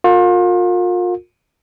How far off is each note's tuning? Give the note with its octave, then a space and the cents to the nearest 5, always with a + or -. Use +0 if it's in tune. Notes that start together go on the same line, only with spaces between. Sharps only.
F4 +35 A#4 -30